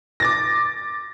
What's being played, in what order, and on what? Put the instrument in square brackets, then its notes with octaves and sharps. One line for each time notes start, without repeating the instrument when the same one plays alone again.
[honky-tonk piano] D6 A6 A#6